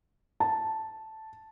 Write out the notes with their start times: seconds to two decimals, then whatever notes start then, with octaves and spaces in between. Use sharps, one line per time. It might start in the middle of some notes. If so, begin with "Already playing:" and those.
0.40 A5